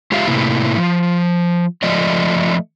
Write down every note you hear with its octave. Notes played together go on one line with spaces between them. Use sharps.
G#3 F4 G4 E5 F5
A2 C3 A#3 E4
F3
F3 A3 D5 D#5